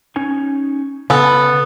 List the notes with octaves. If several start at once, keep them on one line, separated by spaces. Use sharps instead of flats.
C#4 D#4 G#5
C#3 B3 A4